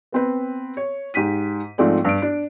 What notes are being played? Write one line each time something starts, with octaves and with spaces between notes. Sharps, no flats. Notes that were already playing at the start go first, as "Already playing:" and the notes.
B3 C4 B4
C#5
G#2 G4 B6 D#7
G#2 F3 A3 C4 D5
G2 D7
D4